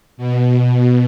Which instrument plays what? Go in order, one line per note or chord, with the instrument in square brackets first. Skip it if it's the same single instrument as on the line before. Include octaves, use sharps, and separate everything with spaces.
[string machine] B2